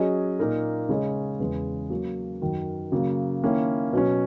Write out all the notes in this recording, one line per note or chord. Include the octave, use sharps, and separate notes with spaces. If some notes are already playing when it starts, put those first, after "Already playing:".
Already playing: F#3 C#4 G#4 D#5
A#2 A#3 D#4 A#4
C#3 G#3 C#4 G#4 D#5
E2 C#3 G#3 B3
F#3 A#3 C#4
F#2 D#3 F#3
C#3 F#3 A#3
D#3 A#3 C#4 E4
B2 F#3 C#4